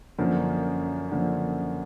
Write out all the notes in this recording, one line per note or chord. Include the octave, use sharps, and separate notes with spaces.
F#2 D3 F3 A#3
D3 F3 A#3